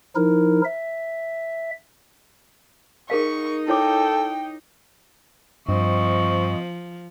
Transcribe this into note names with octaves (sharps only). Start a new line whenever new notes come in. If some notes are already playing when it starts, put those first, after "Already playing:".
F3 D#4 E4 A#4
E5
D#4 G#4 A#4 F5 C#6
E4 A4 C#5 G5 D6
G2 F3 C4 D#5 C#6